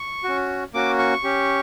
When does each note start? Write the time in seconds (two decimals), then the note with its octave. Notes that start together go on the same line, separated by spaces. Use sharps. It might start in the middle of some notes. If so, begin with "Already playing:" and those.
Already playing: C#6
0.24 C#4 F#4
0.74 A#3 C#4 F#4 D6
0.99 C#6
1.24 C#4 G4